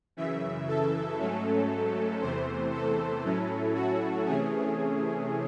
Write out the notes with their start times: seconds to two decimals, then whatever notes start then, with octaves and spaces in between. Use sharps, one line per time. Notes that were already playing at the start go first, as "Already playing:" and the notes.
0.17 F#2 C#3 E3 E5
0.68 A4
1.19 G#2 F#3 A3 C#4
2.21 E2 C3 E3 A3 C5
2.73 A4
3.24 A2 F#3 C#4 E4
3.75 F#4
4.26 C3 E3 A3 C#4 G#4